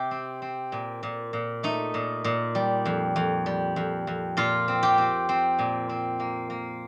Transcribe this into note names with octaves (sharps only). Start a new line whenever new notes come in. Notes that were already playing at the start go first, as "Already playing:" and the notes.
Already playing: C3 G4
C4
C4
A#2
A#2
A#2
A3 D#4
A#2
A#2
G3
F2
F2
G3
F2
F2
A#2 F4
C4
G4
C4
C4
A#2
C4
A#3
A#3